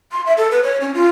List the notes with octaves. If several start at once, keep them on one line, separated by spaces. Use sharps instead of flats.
C6
E5
A4
B4
C#5
C#4
F4